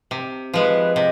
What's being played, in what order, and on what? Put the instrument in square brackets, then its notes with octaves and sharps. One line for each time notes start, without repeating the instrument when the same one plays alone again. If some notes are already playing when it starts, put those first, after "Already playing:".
[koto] C3
[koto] F3 G#3 [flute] B4
[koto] C3 [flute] D#5